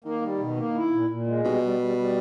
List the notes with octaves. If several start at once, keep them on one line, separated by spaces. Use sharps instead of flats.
D#3 A#3
G3
B2
A#3
E4
A#2
A#2
G#3
B2 G3
G3
G3
G3